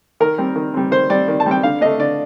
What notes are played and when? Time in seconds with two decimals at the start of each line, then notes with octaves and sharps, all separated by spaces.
0.20 D#3 A#4
0.38 G3 C4
0.56 D#3
0.74 G3 C4
0.91 D#3 C5
1.10 G3 C4 D5
1.28 D#3
1.40 A5
1.46 G3 C4 G5
1.63 D3 F5
1.81 A3 D4 D#5
2.00 D3 D5